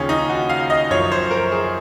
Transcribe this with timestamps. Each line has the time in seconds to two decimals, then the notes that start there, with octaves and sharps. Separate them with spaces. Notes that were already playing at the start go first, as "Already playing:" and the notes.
Already playing: D#2 C#3 F3 C#4 G#4
0.09 D#4
0.29 F#4
0.50 F5
0.70 D#5
0.90 F#2 F3 C#5
1.12 C5
1.31 A#4
1.52 G#4